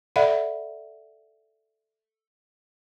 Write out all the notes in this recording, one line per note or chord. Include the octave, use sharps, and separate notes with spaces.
A4 D5 E5 F#5 B5